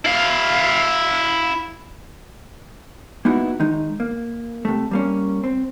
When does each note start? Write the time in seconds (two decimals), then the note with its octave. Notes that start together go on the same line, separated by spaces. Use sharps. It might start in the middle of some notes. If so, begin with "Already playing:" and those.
0.05 E4 F5
3.25 A#3 B3 D#4 E4 F#4
3.60 D#3 G#3 D#4
4.00 A#3
4.65 C3 A3
4.91 G3 A#3 C#4
5.44 C4